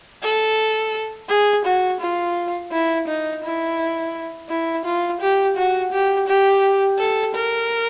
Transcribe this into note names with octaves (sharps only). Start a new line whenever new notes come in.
A4
G#4
F#4
F4
E4
D#4
E4
E4
F4
G4
F#4
G4
G4
A4
A#4